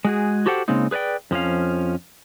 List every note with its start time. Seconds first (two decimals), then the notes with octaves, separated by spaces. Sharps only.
0.05 G#3 F#4 G#4
0.46 F#4 G4 A4 C5 F#5 G5
0.68 C#3 G#3 A#3 C4 D#4
0.91 G#4 B4 C#5 D5 G5
1.31 F2 F3 C#4 F5